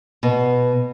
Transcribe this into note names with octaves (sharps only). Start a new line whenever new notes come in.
B2